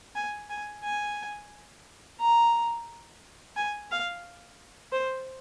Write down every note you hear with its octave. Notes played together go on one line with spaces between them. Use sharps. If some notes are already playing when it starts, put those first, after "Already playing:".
G#5
G#5
G#5
A#5
G#5
F5
C5